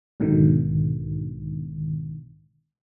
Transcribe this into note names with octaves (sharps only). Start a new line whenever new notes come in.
B1 G#2 B2 D3 D#3